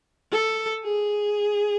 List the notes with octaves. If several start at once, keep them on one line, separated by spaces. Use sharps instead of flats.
A4
G#4